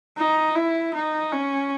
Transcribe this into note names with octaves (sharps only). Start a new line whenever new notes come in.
D#4
E4
D#4
C#4